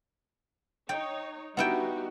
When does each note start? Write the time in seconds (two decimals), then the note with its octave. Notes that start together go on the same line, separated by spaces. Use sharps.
0.89 D#4 C#5 G5
1.57 G3 B3 D#4 E4 F#4 G5